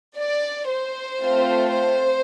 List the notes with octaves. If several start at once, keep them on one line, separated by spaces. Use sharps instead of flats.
D5
C5
A3 C4 F4
C5